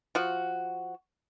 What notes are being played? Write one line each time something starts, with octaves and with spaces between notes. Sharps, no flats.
F3 F#4